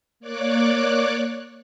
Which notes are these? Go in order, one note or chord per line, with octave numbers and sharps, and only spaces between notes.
A#3 C#5 D5 D6 F#6